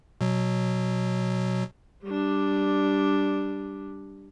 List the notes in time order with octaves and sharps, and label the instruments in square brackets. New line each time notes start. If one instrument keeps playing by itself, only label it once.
[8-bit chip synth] B2 F#3
[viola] G3 D4